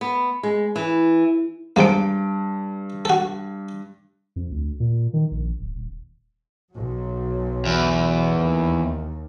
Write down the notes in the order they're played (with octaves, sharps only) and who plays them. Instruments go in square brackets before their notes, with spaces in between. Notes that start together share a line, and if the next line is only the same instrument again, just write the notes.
[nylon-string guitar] B3
G#3
E3
[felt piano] G2 D7 [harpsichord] F3 G#3 A#3
[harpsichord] F#4 A4
[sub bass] F2
D2
A#2
D#3
A#1
D1
D#1
[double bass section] B1 F#3
[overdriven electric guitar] E2
[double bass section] D#2